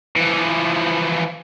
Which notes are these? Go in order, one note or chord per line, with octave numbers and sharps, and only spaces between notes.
E3 F3